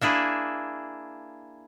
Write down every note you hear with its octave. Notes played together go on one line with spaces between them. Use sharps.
A#3 D4 E4 G#4